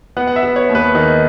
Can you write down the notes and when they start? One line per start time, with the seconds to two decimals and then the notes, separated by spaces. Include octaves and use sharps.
0.17 B3 F#5
0.27 F#5
0.36 E5
0.43 B3
0.56 C#5
0.69 D#2
0.75 B4
0.95 D#3